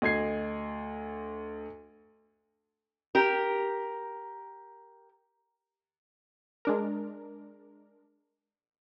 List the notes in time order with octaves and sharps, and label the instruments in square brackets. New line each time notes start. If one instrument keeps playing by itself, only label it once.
[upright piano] D2 D#5 G#6 C7
[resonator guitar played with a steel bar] G4 A#4
[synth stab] G#3 D4 A#4